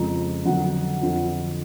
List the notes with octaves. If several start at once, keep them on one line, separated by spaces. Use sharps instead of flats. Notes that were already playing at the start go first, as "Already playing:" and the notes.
Already playing: F2 C#3 F3 G#3 A#5
F2 D3 F#3 F#5
F2 D3 F3